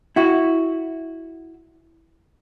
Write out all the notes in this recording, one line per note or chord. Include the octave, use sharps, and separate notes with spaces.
E4 F#4